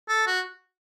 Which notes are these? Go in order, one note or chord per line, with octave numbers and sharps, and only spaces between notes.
A4
F#4